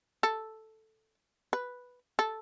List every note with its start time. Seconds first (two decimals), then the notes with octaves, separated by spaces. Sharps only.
0.23 A4
1.53 B4
2.19 A4